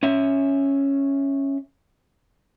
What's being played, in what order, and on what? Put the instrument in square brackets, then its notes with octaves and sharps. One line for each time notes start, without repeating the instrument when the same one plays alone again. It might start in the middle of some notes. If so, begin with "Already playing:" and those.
[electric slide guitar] C#4 E5